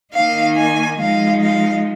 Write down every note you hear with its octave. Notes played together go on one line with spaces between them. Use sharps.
D#3 A#3 D#4 F5
G#5
F3 G#3 D#4 F5
F5